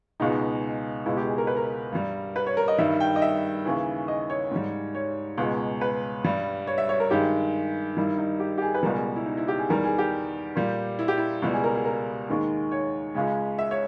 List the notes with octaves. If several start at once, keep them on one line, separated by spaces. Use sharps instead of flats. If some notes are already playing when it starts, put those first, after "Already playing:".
C#2 B2 G#3 D#4
C#2 B2 G#3 E4
G4
G#4
A#4
B4
A#4
G2 G3
B4
C#5
A#4
D#5
G2 D#3 G3 E5
G5
D#5
E5
D#2 C#3 E3
D#5
C#5
G#2 G3
C#5
C#2 B2 G#3
B4
G2 G3
C#5
E5
C#5
A#4
G2 D#3 G#3 G4
G2 D#3 G3 E4
D#4
G4
G4
G#4
B4
C#2 B2 G3 A#4
G#4
E4
D#4
E4
G4
G#4
E2 D#3 G3 A#4
G#4
G4
A#2 G3
E4
G4
E4
C#2 B2 G3 E4
G#4
A#4
G#4
A#4
D#2 D#3 G#3
C#5
C#2 C#3 G#3
E5
C#5